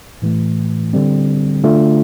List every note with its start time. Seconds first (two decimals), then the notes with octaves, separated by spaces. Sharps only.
0.22 A2 E3 A3
0.93 D3 G3 C4
1.64 D3 A3 D4 F4